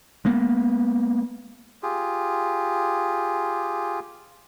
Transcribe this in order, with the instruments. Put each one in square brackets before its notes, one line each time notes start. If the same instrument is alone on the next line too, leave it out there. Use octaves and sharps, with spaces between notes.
[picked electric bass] G#3 A#3 B3
[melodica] F4 G4 G#4